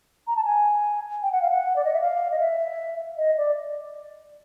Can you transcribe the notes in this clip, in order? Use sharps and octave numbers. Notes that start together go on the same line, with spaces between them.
A#5
A5
G#5
G5
F#5
F5
F#5
D5
D#5
E5
F5
D#5
E5
D#5
D5